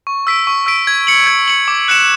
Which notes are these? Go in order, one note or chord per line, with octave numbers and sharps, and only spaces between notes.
C#6
E6 B6 D7
C#6
E6 B6 D7
G#6
C#7 F#7
G#6
C#7 F#7
D6
F#6 C#7 E7